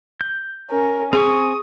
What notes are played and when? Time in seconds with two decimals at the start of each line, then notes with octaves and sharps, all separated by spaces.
0.21 G6
0.70 C#4 A#4
1.13 C4 G#4 G#5 C#6 D#6